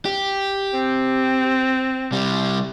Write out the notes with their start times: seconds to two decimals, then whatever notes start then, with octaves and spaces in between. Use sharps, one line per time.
0.05 G4
0.74 C4
2.12 C3 G3